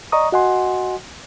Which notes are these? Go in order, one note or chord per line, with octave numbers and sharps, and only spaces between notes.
D5 D#5 A#5 C#6 D#6
F#4 D#5 F#5 G#5 C6